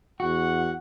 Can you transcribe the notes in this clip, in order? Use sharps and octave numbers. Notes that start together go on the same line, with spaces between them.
E2 F#4 F#5